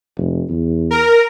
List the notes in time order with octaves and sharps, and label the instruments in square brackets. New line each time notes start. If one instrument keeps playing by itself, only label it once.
[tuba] F1
E2
[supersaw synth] A#4